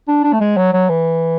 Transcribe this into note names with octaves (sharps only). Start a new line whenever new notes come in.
D4
D4
A3
G#3
F#3
F#3
E3